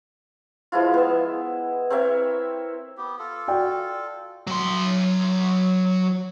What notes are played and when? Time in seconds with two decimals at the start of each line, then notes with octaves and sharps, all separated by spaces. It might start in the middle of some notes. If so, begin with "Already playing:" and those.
0.72 F3 G#3 E4 F4
0.94 B3 E5
1.90 C4 A#4 C#5 E5
2.98 B3 G4
3.19 F4 A4
3.48 F#4 D5 G5
4.47 F#3 C6